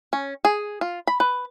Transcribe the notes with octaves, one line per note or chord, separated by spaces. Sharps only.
C#4
G#4
F4
B5
B4